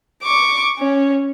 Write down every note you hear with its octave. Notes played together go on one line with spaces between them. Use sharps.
C#6 D6
C#4